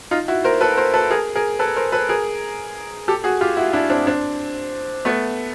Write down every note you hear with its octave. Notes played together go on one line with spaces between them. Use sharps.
D#4 F4
E4 F#4
A#4 C5
A4 B4
A#4 C5
A4 B4
G#4 A#4
G#4 A#4
A4 B4
A#4 C5
A4 B4
G#4 A#4
G4 A4
F#4 G#4
F4 G4
E4 F#4
D4 E4
C4 D4
C4 D4
A3 B3